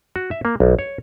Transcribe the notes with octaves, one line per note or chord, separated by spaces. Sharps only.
F#4
E5
A#3
B1
C#5